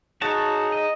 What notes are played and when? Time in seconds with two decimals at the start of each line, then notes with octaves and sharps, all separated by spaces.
0.21 D#4 F#4 G#4 C#5 A5
0.72 D#5